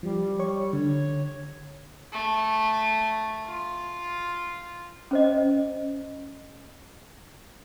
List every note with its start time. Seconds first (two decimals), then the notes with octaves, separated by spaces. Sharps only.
0.03 F3 G3
0.39 C#5 C#6
0.73 D3 C#5
2.12 A3
3.46 F4
5.11 C#4 C5 D#5